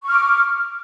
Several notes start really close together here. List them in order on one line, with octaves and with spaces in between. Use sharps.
C#6 F6 D6